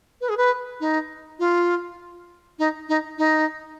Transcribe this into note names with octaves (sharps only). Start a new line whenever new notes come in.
B4
G#4
B4
D#4
F4
D#4
D#4
D#4